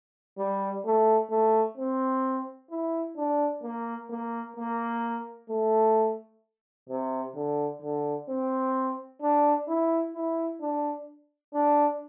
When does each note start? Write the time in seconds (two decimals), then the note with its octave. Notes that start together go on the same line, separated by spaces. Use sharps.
0.38 G3
0.85 A3
1.30 A3
1.77 C4
2.70 E4
3.17 D4
3.63 A#3
4.10 A#3
4.57 A#3
5.50 A3
6.89 C3
7.35 D3
7.82 D3
8.29 C4
9.22 D4
9.68 E4
10.15 E4
10.61 D4
11.54 D4